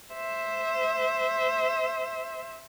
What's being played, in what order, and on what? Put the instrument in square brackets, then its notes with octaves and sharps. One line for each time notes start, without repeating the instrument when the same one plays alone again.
[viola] C5 E5